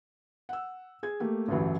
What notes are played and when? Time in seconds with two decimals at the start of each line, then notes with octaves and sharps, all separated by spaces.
0.49 F#5 E6
1.03 G#4 G#6
1.20 A3 A#3 G4
1.48 A1 D2 G2 E3 F#3